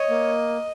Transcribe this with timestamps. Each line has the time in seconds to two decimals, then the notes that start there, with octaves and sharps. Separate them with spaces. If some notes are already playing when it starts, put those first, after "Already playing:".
Already playing: C#5 D#5
0.09 A#3